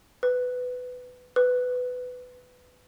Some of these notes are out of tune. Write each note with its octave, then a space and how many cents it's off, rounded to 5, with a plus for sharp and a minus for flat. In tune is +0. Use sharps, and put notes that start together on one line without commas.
B4 +15
B4 +15